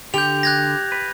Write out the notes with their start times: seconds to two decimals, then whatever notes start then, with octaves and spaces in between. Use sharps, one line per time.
0.14 D3 G4 G6 F7
0.43 F#6 G#6 A#6
0.92 B4